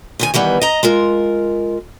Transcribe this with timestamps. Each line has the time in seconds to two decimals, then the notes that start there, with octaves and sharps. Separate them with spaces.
0.19 D#2 D#3 G#5
0.34 D#3 E3 G3 B3
0.61 D#5 A#5
0.83 G#3 F4 A#4